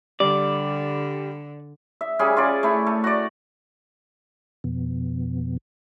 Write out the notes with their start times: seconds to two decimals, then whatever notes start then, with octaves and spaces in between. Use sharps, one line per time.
0.20 D3 G3 D5
2.01 E5
2.19 C#3 G3 C#4 G#4
2.37 F4 C#5 D5
2.63 A3 E4
2.87 A3
3.04 F#4 D5
4.64 F2 B2